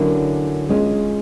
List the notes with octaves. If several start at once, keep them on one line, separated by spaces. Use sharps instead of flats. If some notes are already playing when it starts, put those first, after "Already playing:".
Already playing: D3 F#3 A#3 C#4 E4
G#3 C#4 F4